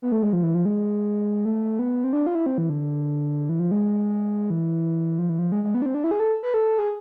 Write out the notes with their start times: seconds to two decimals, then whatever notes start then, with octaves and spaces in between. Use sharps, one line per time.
0.02 B3
0.12 A3
0.23 G#3
0.33 F3
0.43 E3
0.55 F3
0.65 G#3
1.45 A3
1.79 B3
2.04 C4
2.13 D4
2.27 F4
2.35 E4
2.46 C4
2.58 E3
2.69 D3
3.49 E3
3.59 F3
3.71 G#3
4.50 E3
5.19 F3
5.29 E3
5.39 F3
5.52 G#3
5.64 G#3
5.75 B3
5.82 D4
5.86 C4
5.94 D4
6.04 E4
6.11 G#4
6.20 A4
6.43 B4
6.54 A4
6.78 G#4